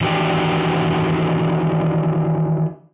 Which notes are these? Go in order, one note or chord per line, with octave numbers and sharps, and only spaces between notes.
D#3 E3 D4 F#4 G4